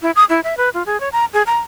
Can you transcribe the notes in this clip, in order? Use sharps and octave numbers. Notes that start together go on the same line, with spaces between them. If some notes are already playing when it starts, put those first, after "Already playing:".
E4
D#6
E4
E5
B4
F4
G#4
C#5
A#5
G#4
A#5